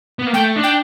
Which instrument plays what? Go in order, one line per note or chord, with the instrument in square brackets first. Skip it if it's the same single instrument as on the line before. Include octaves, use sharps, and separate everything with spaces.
[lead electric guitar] B3
A#3
[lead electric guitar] A3 [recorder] G5
[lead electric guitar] D4
[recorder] G5